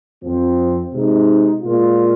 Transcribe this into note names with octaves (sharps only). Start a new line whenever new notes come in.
F2 F3 C4
C3 G#3 D#4
A#2 G#3 F4